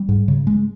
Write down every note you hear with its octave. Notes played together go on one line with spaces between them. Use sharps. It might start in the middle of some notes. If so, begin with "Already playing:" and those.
Already playing: G3
G#2
C#3
G#3